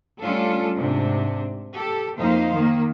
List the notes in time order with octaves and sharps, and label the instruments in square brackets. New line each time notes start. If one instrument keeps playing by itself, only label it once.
[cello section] G3 A3 C#4 D4 F4 A4
G#2 C3 D4
G4 A4
F2 A#3 D#4 C5 F5
D#3 A#3